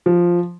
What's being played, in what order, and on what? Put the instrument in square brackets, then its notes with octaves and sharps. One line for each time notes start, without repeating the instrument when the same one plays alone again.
[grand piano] F3